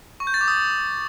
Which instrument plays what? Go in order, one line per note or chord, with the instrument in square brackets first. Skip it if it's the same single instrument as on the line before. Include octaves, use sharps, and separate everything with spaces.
[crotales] C#6
G6
A6
D6
D#6